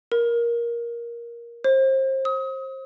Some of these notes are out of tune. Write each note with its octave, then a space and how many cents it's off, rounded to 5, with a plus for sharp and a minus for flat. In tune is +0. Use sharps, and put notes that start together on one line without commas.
A#4 +10
C5 +30
D#6 +30